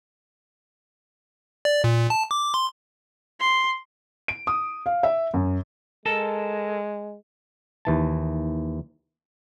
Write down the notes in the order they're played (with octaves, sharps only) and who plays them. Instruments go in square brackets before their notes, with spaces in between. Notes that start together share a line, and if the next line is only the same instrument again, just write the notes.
[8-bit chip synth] D5
A#2
A5
D6
C6
[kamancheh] C6
[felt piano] D7
D#6
F5
E5
F#2
[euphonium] G#3 [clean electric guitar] A4 A#4 A5
[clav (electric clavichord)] D#2 E3 A5